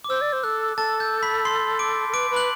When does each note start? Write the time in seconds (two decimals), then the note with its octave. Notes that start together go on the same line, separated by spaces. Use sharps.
0.04 D6
0.09 C5 E6
0.21 D5
0.33 C5
0.44 A4 F#6
0.77 A4 A5 A6
1.00 G6
1.22 B5 B6
1.45 C6 C7
1.79 D6 D7
2.09 A4
2.13 B4 D6 D7
2.30 B4
2.36 F#6 F#7